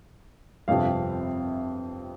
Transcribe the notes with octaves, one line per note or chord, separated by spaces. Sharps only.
G1 F2 C3 F3 F5